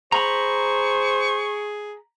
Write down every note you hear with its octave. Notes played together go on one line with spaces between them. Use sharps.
G#4 C5 A#5 B5 C#6